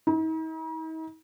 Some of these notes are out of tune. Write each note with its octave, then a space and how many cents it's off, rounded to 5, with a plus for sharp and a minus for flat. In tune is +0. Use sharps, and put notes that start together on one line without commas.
D#4 +45